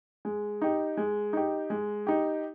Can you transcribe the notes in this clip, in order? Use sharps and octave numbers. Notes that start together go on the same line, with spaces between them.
G#3
D#4 G4
G#3
D#4 G4
G#3
D#4 G4